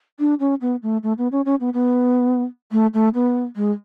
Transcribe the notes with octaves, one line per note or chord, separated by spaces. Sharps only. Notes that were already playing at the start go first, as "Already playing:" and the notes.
D4
C#4
B3
A3
A3
B3
C#4
C#4
B3
B3
A3
A3
B3
G#3